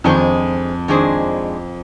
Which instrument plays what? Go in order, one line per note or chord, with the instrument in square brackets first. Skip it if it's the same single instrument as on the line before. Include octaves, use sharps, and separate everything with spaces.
[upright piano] F2 [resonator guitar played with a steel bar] D#3 G#3 D4 G#4 C5
[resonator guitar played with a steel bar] D#3 G#3 D4 G#4 C5